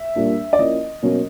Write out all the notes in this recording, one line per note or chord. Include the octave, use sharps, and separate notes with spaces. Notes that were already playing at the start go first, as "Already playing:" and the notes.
Already playing: E5
A#2 G3 A#3 D4
D5
F3 A#3 C#4 E4 D#5
B2 F#3 A#3 C#4